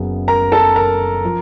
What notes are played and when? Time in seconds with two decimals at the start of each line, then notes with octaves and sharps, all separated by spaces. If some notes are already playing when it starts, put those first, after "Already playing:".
Already playing: F#1 F#2 C#3 F#3 B3
0.28 A#4 A#5
0.52 A4 A5
0.76 A#4 A#5
1.25 F3